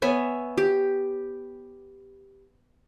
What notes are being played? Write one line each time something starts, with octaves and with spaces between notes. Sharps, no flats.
B3 C#5 E5 G#5
G4